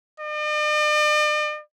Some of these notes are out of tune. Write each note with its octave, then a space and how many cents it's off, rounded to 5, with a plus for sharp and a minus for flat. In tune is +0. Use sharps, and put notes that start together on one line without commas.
D5 +45